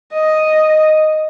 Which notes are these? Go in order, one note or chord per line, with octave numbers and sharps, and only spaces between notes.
D#5